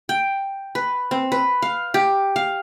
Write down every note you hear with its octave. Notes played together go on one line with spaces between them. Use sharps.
G5
B4
C4
B4
F5
G4
F5